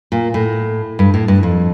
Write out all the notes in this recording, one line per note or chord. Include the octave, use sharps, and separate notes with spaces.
A#2
A2
G2
A2
G2
F2